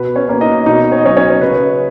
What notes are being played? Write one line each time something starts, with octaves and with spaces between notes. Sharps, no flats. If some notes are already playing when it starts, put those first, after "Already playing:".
Already playing: B2 B4
C#4 C#5
A#3 C#4
D#4 D#5
B2 D#4 D#5
C#5
D#5
F#3 C#4 C#5
C#4 C#5
C#3 B4